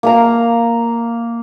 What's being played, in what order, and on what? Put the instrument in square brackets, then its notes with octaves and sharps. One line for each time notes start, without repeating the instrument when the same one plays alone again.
[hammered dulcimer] A#3 F5 A#5